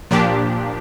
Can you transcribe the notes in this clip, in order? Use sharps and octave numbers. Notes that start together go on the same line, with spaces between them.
A#2 F3 D4 G4